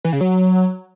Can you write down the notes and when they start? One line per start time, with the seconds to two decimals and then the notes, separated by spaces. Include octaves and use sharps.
0.04 E3
0.13 C#3
0.21 F#3